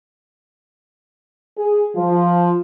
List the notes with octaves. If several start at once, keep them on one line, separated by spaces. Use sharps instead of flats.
G#4
F3